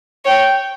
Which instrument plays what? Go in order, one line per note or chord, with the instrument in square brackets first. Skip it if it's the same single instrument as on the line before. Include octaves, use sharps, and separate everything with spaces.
[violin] C#5 [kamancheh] G5